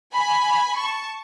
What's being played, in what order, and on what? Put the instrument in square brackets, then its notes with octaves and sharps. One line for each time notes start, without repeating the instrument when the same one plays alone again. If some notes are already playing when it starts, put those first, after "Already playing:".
[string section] G#5 B5
A5 C#6